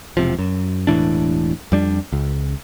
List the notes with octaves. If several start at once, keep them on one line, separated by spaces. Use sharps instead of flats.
E1 C3 F3
F#2
E1 A2 E3 D4
F2 G3 D4
C#2